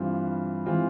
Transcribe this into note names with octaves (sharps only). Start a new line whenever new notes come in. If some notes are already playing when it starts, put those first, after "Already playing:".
Already playing: G2 E3 G3 C4 F4
E3 G#3 C4 F4